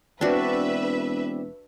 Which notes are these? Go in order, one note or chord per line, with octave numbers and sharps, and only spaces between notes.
E1 C4 D4 F#4 B4 D5 E5